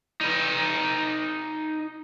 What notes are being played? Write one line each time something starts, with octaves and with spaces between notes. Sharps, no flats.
D#4 B4